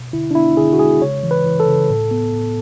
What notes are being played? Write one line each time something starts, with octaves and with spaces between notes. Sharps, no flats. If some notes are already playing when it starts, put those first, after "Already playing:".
Already playing: B2
D3 E4
D4
B3 E4
D3 G#4
F#4
G#3 G#4
C#3 C#5
E3
B4
E3
A4
C#3
A2
B3
A2